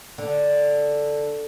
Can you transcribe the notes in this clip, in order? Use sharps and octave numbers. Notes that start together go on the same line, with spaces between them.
D3